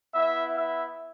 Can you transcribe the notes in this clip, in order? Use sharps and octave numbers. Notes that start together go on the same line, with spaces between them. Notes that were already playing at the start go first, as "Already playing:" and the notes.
B3 E4 E5
E5